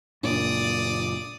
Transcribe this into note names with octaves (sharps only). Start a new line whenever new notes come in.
F#1 A#2 D4 D5 D#6